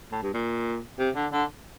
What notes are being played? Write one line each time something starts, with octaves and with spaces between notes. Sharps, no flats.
A2
G2
A#2
C3
D3
D3